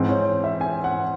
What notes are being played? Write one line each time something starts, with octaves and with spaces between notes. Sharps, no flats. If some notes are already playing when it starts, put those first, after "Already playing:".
Already playing: G#2 E3 C4 C5
C#5
E5
G#5
F#5